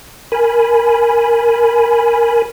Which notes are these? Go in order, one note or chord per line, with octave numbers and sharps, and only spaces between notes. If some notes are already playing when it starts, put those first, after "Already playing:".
A#4 G#5 B5